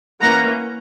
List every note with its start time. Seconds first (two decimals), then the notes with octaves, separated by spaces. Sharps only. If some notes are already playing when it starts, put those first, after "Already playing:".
0.21 E3 A#3 C#4 F#5 A#5